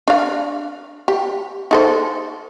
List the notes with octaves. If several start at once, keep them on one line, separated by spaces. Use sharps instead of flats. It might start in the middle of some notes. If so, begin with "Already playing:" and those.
D4 F5
G4
D#4 A4 C5